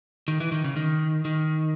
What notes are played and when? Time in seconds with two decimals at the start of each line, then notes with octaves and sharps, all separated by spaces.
0.28 D#3
0.40 E3
0.52 D#3
0.64 C#3
0.76 D#3
1.25 D#3